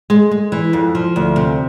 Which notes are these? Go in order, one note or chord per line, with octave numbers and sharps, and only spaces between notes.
G#3
G#3
E3
F2
F3
D2
C3